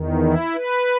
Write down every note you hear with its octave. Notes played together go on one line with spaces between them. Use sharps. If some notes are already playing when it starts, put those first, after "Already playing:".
Already playing: E2 D#3
E4
B4